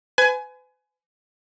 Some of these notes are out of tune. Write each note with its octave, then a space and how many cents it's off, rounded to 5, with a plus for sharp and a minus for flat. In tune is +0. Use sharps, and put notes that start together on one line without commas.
B4 +40 G#5 +20